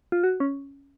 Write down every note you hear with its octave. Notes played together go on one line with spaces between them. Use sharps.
F4
F#4
C#4